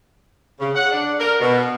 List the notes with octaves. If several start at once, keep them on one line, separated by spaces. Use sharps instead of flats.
C#3
F#5
D4
A#4
B2